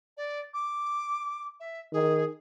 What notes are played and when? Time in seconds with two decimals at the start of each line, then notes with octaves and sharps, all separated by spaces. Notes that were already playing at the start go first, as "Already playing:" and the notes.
0.17 D5
0.53 D6
1.60 E5
1.93 D#3 G#4